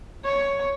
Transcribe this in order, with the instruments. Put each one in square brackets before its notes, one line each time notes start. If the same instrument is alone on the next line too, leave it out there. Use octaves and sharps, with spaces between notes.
[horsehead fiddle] C#5